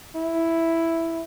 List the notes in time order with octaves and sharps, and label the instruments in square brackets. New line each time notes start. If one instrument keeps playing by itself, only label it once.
[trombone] E4